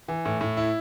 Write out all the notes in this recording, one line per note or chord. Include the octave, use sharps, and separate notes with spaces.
E3
A2
A2
E4